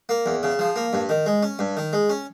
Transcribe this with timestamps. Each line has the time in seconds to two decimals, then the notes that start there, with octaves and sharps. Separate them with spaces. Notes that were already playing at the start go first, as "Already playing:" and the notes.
0.09 A#3
0.26 E2
0.43 C#3
0.59 F3
0.76 A#3
0.93 G2
1.09 D#3
1.26 G#3
1.43 C#4
1.59 G2
1.77 D#3
1.93 G#3
2.10 C#4